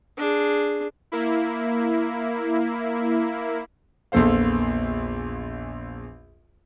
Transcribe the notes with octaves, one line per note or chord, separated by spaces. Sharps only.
D4 G#4
A#3 E4
A#1 E2 A#2 A4 C5 F5